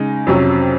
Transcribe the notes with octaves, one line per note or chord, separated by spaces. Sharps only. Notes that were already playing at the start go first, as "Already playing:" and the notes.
Already playing: C#3 G#3 D#4
F2 C3 F#3 C#4